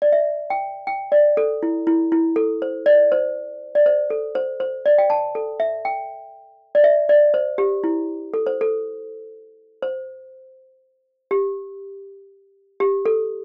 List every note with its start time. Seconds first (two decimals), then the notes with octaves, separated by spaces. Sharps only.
0.02 D5
0.12 E5
0.50 G5
0.87 G5
1.12 D5
1.37 A4
1.63 E4
1.87 E4
2.12 E4
2.36 A4
2.62 C5
2.86 D5
3.12 C5
3.75 D5
3.86 C5
4.10 A4
4.35 C5
4.60 C5
4.86 D5
4.98 G5
5.10 A5
5.35 A4
5.60 E5
5.85 G5
6.75 D5
6.84 E5
7.09 D5
7.34 C5
7.58 G4
7.84 E4
8.34 A4
8.47 C5
8.61 A4
9.82 C5
11.31 G4
12.80 G4
13.05 A4